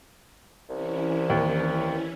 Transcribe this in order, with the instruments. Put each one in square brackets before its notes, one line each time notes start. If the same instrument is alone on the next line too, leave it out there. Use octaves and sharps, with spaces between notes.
[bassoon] C2 [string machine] E3 C#4 E4
[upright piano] D#2